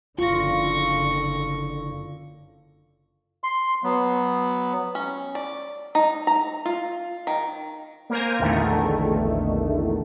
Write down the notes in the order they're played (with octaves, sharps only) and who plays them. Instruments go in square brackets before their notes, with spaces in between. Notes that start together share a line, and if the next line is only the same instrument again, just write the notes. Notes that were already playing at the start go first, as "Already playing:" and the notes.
[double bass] F#1 D3 [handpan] F4 [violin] C#6 A#6
[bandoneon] C6
F#3 B3
[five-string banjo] C#4
D5
D#4
A#5
F4
D#3
[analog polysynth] A#3 A#4 C5 G#5
A#1 E2 D3 D#3 A3